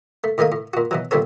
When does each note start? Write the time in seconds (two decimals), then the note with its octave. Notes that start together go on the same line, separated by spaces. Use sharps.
0.24 A3
0.38 A2 D#3 A3 A#3 D#6
0.52 A2
0.74 A#2 F#4
0.91 B2 E3 F#3
1.11 A#1 D3 G3 B3 A4 C#5